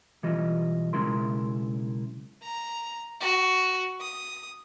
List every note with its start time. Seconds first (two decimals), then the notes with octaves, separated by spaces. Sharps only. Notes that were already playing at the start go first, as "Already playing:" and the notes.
0.23 B1 E3 G3 F4 D#5
0.93 B1 C#3 G#3 E4 A#4 C6
2.43 A#5
3.21 F#4
4.01 D#6